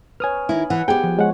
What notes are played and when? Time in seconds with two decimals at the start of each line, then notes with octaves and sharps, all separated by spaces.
0.20 B4 C#5 G#5 D#6 F6
0.49 D#3 E4
0.70 E3 F#5
0.88 B3 G4 G#4 G5
1.04 F3
1.19 G#3 C#5 F#5